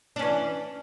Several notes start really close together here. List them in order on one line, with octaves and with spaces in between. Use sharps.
D4 C#4 E3